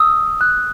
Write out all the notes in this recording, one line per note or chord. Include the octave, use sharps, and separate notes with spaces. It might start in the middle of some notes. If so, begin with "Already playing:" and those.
Already playing: D#6 E6
F#6